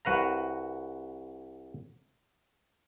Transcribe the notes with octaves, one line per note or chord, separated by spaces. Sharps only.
C2 F#4 B4 F5 A#5